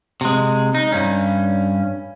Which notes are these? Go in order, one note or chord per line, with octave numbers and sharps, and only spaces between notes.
C3 G#3
D#4
G2 C#4